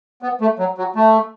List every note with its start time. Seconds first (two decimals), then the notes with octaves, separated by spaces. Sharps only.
0.22 B3
0.41 A3
0.59 F#3
0.78 F#3
0.95 A3